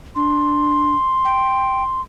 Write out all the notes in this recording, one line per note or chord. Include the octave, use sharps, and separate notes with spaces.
D4 C6
G5